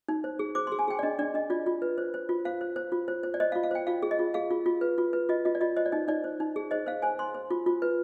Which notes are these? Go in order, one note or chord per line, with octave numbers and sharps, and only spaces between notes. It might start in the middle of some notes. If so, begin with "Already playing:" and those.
D#4
C5
G#4
C5 D6
C6
G#4
G#5
G#4 G5
D5
D4 D#5
D4 D5
D4 D#5
F4 D5
F4
B4
C5
C5
F4
C5 F5
C5
C5
F4
C5
C5
D5
C5 D#5
F5
F4
F5
C5 G5
F4 F5
G#4
D#5
F4
G#4 F5
F4
F4
B4
F4
B4
F4 D#5
F4 D#5
D5
F4 D#5
C5 D#5
D5
D#4 D#5
D#4 D5
C5
D#4
G#4
C5 D#5
C5 F5
C5 G#5
C5 C6
C5
F4
F4
B4